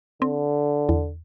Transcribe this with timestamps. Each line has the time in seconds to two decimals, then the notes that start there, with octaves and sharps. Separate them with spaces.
0.22 D3 C4
0.89 E2